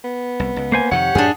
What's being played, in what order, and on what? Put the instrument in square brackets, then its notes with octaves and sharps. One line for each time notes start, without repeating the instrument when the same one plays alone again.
[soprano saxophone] B3
[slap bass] C2
C#2
[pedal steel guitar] A#3 C5 G#5
[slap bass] F2 C3 D#3 [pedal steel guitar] G4 C#5 [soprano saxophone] F#5
[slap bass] F#2 A2 A3 [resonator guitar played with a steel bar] D4 G#4